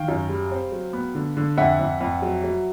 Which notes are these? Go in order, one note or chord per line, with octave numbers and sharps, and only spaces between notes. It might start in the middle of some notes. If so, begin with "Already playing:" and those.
Already playing: D#3 F5 G5
F#2
G3
C4
F#3
B3
D3
D3
F2 E5 F#5
F2
F2
F#3
F#3